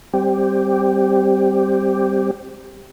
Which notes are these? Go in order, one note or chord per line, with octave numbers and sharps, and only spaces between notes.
G3 C4 G4